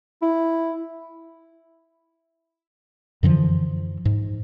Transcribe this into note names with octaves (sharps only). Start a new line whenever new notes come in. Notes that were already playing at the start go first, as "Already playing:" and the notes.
E4
F#2 D3 E3 F3
G#2